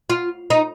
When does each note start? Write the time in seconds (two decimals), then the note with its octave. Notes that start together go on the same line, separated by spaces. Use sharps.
0.10 F4
0.50 D#4